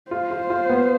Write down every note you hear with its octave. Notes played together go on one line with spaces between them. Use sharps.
F4 C5
F4
F4
B3